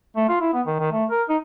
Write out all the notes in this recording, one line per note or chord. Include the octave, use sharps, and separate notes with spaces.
A3
F4
E4
B3
D#3
D#3
A3
A#4
D#4